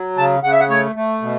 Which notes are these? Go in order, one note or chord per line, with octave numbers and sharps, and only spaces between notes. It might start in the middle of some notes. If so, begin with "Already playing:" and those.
Already playing: F#3
C#3 A5
C#3 F#5
E5
F#5
A3 C#5
A3
B2